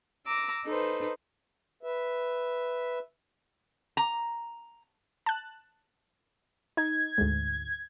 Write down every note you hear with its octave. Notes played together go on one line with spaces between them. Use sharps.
A#5 D6 E6
D#4 A4 B4 C5
B4 E5
A#5
A5 F#6
D#4 G#6
D2 G#2